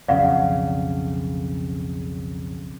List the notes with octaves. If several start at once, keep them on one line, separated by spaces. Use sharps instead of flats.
B1 F2 C#3 D5 F5 F#5